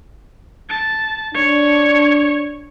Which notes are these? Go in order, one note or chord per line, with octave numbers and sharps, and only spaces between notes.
A5
D4 C#5